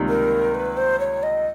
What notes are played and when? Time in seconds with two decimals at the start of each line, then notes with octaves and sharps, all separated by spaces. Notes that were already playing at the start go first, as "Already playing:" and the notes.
Already playing: C#2 C3 D#3 G3 A#3
0.08 A#4
0.55 B4
0.77 C5
0.99 C#5
1.23 D#5